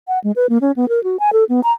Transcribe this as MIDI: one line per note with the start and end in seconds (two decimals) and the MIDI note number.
0.08 0.19 78
0.24 0.32 56
0.36 0.47 71
0.49 0.58 58
0.61 0.72 61
0.76 0.88 59
0.89 1.02 70
1.04 1.17 66
1.20 1.30 80
1.33 1.44 69
1.49 1.60 59
1.63 1.72 82